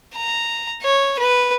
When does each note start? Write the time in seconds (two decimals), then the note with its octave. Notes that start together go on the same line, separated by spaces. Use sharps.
0.15 A#5
0.83 C#5
1.19 B4